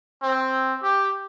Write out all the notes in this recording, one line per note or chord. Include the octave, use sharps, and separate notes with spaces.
C4
G4